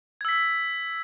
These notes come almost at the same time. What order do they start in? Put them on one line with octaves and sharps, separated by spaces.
G#6 E6 B6